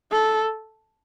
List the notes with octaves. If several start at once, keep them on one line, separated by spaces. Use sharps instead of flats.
A4